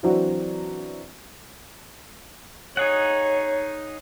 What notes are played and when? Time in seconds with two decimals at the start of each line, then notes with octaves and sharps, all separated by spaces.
0.03 E3 F#3 C4 D4 E4 F#4
2.77 D#4 G#4 C#5 F#5